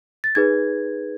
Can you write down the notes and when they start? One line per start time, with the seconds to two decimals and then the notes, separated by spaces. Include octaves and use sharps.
0.24 A6
0.35 D#4 G#4 B4 G#6